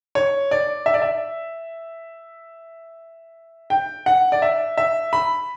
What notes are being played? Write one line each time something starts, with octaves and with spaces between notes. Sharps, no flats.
C#5
D5
E5
D5
E5
G5
F#5
D5
E5
E5
B5